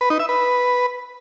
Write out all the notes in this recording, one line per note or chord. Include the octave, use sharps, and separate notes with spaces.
B4
D#4
E5
B4